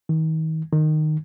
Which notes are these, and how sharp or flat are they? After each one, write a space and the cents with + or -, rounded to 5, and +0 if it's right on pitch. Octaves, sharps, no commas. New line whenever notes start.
D#3 +35
D#3 -15